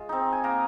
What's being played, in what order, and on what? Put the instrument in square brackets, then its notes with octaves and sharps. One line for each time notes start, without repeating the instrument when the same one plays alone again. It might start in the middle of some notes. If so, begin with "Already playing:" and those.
Already playing: [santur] G#3 F4
C4 D#4
G#5
A#3 A#5